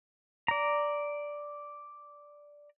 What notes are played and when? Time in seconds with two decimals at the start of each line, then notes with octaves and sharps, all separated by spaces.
0.48 D5 A#5